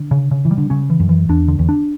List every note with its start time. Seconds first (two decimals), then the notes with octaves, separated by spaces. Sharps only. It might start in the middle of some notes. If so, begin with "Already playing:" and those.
Already playing: D3
0.11 C#3
0.31 C#3
0.45 E3
0.51 G3
0.58 D3
0.70 C#3 C#4
0.90 E3
1.00 F#2
1.09 E3
1.29 E2 D4
1.48 D3
1.59 E2
1.69 D4